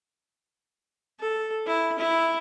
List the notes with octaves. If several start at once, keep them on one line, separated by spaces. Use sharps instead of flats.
A4
E4
E4